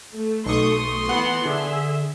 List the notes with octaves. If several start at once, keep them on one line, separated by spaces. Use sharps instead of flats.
A3
B1 A3 C6 C#6 D#6
E3 B3 F#5
D3 G#4 E5